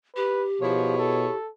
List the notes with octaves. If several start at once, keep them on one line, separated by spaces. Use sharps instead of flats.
G4 B4
B2 F3 E4 G#4 C#5
A4